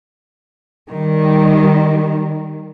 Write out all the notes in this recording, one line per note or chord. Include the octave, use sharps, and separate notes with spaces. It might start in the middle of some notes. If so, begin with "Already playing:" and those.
D#3 G3